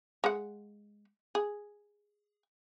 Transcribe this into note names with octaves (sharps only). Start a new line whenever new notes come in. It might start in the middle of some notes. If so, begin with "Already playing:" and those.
G#3 F#5
G#4